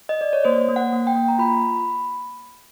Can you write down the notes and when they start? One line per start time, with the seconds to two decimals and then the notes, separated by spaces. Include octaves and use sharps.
0.09 D#5
0.21 D5
0.33 C#5
0.45 A#3 C5
0.68 A#3
0.76 F#5
0.92 A#3
1.07 G5
1.15 A#3
1.29 A#5
1.39 F4 B5